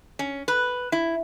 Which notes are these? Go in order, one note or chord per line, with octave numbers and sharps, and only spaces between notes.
C#4
B4
E4